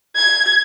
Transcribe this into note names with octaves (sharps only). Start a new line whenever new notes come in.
G#6